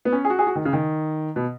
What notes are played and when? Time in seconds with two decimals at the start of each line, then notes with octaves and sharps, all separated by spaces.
0.05 B3
0.12 C#4
0.25 G#4
0.30 F#4
0.39 G#4
0.47 F#4
0.55 D#3
0.65 C#3
0.73 D#3
1.36 B2